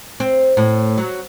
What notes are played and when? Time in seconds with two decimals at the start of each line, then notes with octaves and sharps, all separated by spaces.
0.20 C4
0.57 A2
0.98 F#3